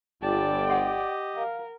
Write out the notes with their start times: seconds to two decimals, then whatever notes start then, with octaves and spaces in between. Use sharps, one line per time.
0.22 G1 D5 G5 A5
0.69 G4 D#5 F#5 C6
1.35 A#4 F5